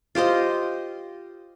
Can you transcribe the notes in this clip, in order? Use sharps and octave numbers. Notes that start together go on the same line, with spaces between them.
F4 G4 C5 D#5